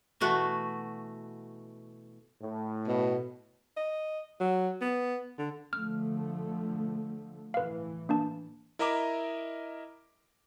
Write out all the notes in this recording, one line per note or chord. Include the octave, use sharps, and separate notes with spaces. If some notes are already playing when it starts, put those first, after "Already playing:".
B2 E3 A3 F#4
A2
B2
D#5
F#3
B3
D3
D3 F3 A3 F6
A2 E3 B4 F5
A#3 D4 A5
E4 A#4 D#5 E5 A#5 D6